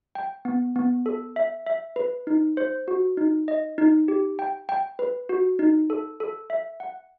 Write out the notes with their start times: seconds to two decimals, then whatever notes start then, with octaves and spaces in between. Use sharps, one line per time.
0.15 G5
0.45 B3
0.76 B3
1.06 A4
1.36 E5
1.66 E5
1.96 B4
2.27 D#4
2.57 C5
2.88 F#4
3.17 D#4
3.48 D#5
3.78 D#4
4.08 G4
4.39 G5
4.69 G5
4.99 B4
5.29 F#4
5.59 D#4
5.90 A4
6.20 A4
6.50 E5
6.80 F#5